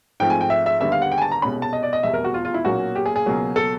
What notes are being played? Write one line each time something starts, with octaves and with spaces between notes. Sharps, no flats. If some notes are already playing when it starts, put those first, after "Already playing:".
G#2 F3 A3 C4 G5
G#5
G5
E5
E5
D#2 D3 G3 B3 E5
F5
F#5
G5
G#5
A5
A#5
C2 B2 G#3 C#4 B5
A5
D#5
D5
D#5
F1 E2 B2 G3 E5
A#4
F#4
F4
F4
E4
B1 A#2 F#3 A#3 C#4 F#4
G4
G#4
G#4
C#2 B2 F#3 A#3
A4